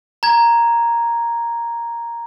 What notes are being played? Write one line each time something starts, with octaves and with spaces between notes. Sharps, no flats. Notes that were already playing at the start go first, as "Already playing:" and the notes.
A#5 G#6